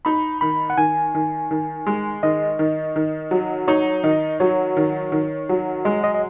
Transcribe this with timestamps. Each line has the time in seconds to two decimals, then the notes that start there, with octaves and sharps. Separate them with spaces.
0.05 D#4 B5
0.41 D#3 B5
0.70 F#5
0.77 D#3 G#5
1.15 D#3
1.51 D#3
1.87 G#3
2.23 D#3 D#5
2.59 D#3
2.96 D#3
3.31 F#3
3.68 D#4 C#5
4.04 D#3 D#5
4.40 F#3 C#5
4.77 D#3
5.12 D#3
5.49 F#3
5.85 G#3 D#5
6.04 D#5
6.14 D#5